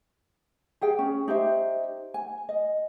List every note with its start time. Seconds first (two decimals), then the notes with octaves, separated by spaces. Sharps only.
0.81 G4 G#4 G5
0.99 C#4
1.28 D#4 G4 C5 E5
2.14 G#5
2.49 D#5